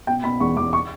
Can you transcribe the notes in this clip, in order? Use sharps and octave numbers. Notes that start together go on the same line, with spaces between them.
B2 G5
B2 B5
E2 C#6
E2 D6
C#6